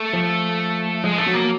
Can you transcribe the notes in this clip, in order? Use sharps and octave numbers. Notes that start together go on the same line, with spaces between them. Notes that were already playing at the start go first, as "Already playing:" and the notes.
Already playing: A3
F3
F3 G#3
A3
F#3
A#3